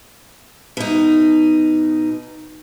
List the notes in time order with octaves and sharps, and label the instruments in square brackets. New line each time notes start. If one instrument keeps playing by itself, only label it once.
[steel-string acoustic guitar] B2 D#4